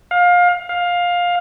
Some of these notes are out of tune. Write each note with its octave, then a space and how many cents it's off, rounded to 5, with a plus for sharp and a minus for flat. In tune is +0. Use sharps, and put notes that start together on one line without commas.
F5 +25
F5 +15